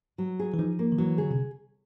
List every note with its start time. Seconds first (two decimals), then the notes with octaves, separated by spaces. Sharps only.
0.18 F#3
0.39 G#4
0.54 E3
0.58 F3 D#4
0.79 A#3
0.92 D#3
0.98 E3 F#3
1.18 D3 G#4
1.31 C3